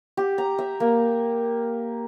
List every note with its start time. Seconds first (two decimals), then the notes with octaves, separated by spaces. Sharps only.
0.17 G4
0.38 A#5
0.58 E5
0.80 A#3